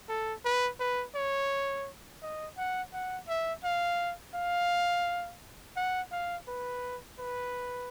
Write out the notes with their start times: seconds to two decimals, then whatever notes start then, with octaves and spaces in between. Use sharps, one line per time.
0.09 A4
0.45 B4
0.80 B4
1.15 C#5
2.22 D#5
2.57 F#5
2.93 F#5
3.28 E5
3.64 F5
4.34 F5
5.76 F#5
6.12 F5
6.48 B4
7.19 B4